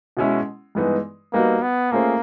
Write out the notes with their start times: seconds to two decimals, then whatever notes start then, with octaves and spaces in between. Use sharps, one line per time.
0.17 B2 G#3 C#4 E4
0.75 G2 E3 G#3 B3 D#4
1.33 G3 A#3 B3 D#4 F#4
1.62 B3
1.91 A3 A#3 C#4 F4 G#4 C5